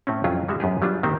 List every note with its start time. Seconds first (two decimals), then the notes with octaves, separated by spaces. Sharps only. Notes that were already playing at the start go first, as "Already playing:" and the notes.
0.07 A2 C4 C#4
0.24 F2 F#3 C#4 E4 F4 G#4
0.48 G3 G#3 F#4 E5
0.60 F#2 B3 G4 G#4
0.81 F#2 F#3 G3 B3 D4 F4
1.03 D#3 A#3 C4 G4 C5